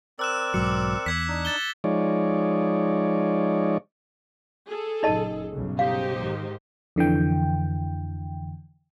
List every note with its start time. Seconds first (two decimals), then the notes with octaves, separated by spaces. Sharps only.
0.19 C4 A#4 D5 E6 F#6 E7
0.54 B1 G#2 F#3 D6 C#7
1.06 E2 E6 G#6 B6
1.29 D4 D#4
1.45 A6 E7 G7
1.84 F3 G#3 D#4 C#5 D5
4.65 G#4 A4
5.03 F#1 A#2 D#4 D#5 A5
5.51 B1 G2 C#3
5.79 D#4 G4 C5 F5
6.18 G#2 D#3 G#3
6.96 F2 D3 E3 G5